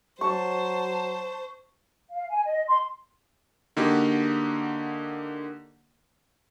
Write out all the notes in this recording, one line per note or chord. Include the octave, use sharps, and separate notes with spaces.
F#3 C5 A5 C#6
F5
G#5
D#5
C6
D3 A#3 D#4 F#4 G4